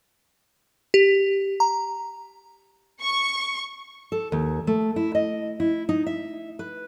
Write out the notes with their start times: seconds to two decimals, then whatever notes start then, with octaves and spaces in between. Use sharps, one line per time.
0.94 G4
1.60 A#5
3.01 C#6
4.12 A4
4.32 D#2
4.67 A3
4.96 E4
5.15 D#5
5.60 E4
5.89 D#4
6.06 E5
6.59 B4